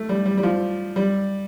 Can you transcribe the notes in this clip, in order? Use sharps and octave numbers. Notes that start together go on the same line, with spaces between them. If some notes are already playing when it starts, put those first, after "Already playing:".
Already playing: A3
G3
G3
G3
F3
G3